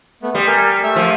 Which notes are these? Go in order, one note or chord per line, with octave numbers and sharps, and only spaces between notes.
A3 B3
G3 C6 D#6
A#4 G#5
A3 E5 E6
F3